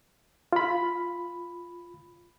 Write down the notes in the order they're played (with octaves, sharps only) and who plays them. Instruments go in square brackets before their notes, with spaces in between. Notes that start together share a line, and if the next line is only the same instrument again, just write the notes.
[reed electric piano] F4 B5